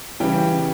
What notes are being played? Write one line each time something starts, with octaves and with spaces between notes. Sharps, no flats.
C#3 E3 G3 G5
C#3